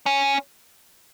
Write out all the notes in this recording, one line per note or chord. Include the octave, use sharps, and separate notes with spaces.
C#4